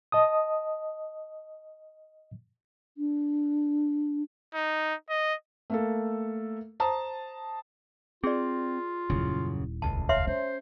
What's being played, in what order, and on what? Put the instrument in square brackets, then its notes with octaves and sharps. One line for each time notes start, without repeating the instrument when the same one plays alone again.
[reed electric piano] D#5 A5 D#6
[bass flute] D4
[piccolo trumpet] D#4
D#5
[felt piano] A3 A#3 A4
C5 A5 A#5 D#6
[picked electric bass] C4 [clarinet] F4 [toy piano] G#4 D5
[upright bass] D#1 E4 [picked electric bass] F#2 C#3
[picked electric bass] F1 C#2 [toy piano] A5
[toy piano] C#5 E5 C6 [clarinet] F5
[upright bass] C#4 [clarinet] C5